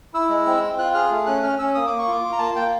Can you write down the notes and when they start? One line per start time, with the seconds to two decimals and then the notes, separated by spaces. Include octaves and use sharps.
0.14 E4 E6
0.29 G#3
0.46 C4
0.63 C4
0.79 F4 F#6
0.94 G#4 F6
1.11 A3
1.26 C#4 F#6
1.43 C#4 F6
1.59 C#4 E6
1.75 A#3 D#6
1.87 A#3 D6
1.99 C#6
2.08 F4 D6
2.24 F4
2.32 A#5
2.39 A#3 A5
2.55 A#3 G5